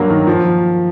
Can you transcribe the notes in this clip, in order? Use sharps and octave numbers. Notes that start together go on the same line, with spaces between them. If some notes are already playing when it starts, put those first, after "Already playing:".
Already playing: G2 F#3 A#3
D#3
F3